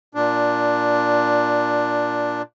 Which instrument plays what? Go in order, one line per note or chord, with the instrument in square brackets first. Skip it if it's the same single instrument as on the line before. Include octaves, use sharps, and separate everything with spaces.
[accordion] A#2 D4